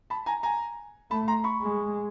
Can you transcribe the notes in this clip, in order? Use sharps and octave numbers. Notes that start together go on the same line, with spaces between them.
A5 B5
G#5 A#5
G#5 A#5
A3 A5 B5
A#5 C6
B5 C#6
G#3